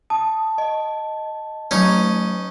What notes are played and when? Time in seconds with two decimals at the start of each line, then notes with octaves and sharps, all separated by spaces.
0.10 A5 D#6
0.58 D#5
1.71 F#3 A3 C#4 D#4